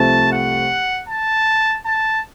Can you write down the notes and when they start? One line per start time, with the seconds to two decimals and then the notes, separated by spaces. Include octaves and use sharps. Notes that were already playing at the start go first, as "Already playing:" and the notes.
Already playing: C2 C3 F3 A3 A5
0.32 F#5
1.09 A5
1.86 A5